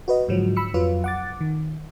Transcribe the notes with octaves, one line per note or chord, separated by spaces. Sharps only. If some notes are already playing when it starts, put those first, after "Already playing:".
F#4 B4 D#5
G#2 D3 F3 F#3
B5 E6 C#7
F2 F#3 F4 B4
F#5 D6 A6
D#3